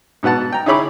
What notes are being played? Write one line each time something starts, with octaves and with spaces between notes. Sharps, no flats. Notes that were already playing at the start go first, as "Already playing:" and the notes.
G#2 B2 B4 F#5 A5
G5 A#5
D#4 E4 G#4 C#5 B5 D6